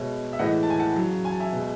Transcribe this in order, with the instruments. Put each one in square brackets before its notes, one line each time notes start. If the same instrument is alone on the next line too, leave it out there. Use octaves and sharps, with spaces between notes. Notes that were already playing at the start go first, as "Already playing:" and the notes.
Already playing: [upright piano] B2 G#3 C#5 E5
E5
A2 E3 G#3 D#5 F#5
A5
G#5
F#5 A5
C#3 F#3
G#5
A5
E5 G#5
B2 G#3